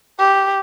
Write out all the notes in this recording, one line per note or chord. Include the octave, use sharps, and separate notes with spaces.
G4